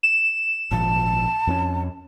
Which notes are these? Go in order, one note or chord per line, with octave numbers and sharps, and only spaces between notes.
E7
G#1 A#2 F3 A5
F2 B3 C#4